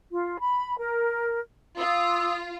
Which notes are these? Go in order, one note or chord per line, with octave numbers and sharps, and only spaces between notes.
F4
B5
A#4
F4 D#6 E6